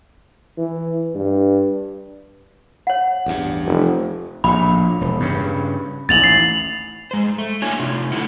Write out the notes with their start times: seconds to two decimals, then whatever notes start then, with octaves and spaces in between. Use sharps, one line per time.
0.58 E3
1.15 G2
2.87 C#5 F#5
3.26 A1 E2 G2
3.66 F1
4.44 A#1 A2 B5
5.01 E1
5.20 G2 C#3
6.09 A1 D#2 A6 F7 F#7
6.24 C7
7.11 G#3 C5
7.38 A3
7.62 A#3 D4 E4 F#4 C#5 G#5
7.80 C3 A3 F4
8.12 D3 E4 F#5